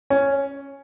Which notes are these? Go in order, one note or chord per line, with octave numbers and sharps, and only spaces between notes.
C#4